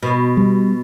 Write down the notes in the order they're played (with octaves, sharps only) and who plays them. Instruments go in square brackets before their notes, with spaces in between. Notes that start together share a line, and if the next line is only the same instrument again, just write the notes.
[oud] B2
[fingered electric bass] G3